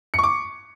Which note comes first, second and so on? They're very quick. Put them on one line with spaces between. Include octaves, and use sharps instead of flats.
C#7 C#6 D6